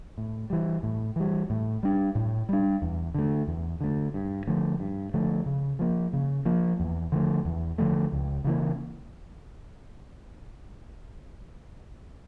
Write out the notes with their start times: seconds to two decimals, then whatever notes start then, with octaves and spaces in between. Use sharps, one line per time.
0.18 A2
0.50 E3 G3
0.83 A2
1.16 E3 G3
1.50 A2
1.83 G3 D4
2.15 A2
2.49 G3 D4
2.82 E2
3.14 D3 A3
3.47 E2
3.81 D3 A3
4.14 G2
4.48 D3 F3 A3
4.80 G2
5.14 D3 F3 A3
5.46 C#3
5.79 F3 A#3
6.13 C#3
6.46 F3 A#3
6.80 E2
7.12 D3 F3 A3
7.45 E2
7.78 D3 F3 A3
8.12 C#2
8.44 C#3 E3 A#3